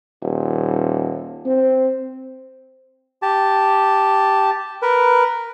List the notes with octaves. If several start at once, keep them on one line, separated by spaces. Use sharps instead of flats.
D#1
C4
G4 A5
A#4 B4